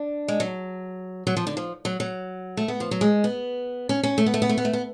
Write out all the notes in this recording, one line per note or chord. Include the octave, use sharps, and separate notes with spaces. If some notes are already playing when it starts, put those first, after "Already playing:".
Already playing: D4
G#3
F#3
F#3
F3
D3
F3
F#3
F#3
A3
B3
F3
F#3
G#3
B3
C#4
C#4
A3
B3
A3
B3
A3
B3
A3
B3